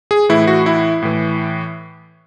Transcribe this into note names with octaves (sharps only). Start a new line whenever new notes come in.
G#4
A2 E3 E4
F#4
E4
A2 E3